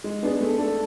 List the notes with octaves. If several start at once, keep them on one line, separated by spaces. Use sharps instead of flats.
G#3
B3 D4 G#4
A3
D4 A4